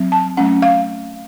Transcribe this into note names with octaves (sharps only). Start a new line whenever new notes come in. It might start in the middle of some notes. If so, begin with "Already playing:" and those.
Already playing: F#3 C4
A5
F#3 A3 C#4 F#5
F5